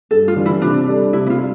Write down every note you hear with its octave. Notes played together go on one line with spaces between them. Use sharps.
G2 A4
F4
E3 G3 D4
E4
C3 D4
G3 D4 A4
C3 E4
E4
F4
G3